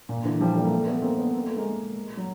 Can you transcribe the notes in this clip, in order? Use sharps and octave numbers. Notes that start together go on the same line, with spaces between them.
A#2
D3 E3
F3 G3
G3 A3
A#3
G3 A3
A3 B3
A#3 C4
B3
A#3
A3
G#3 A#3
F#3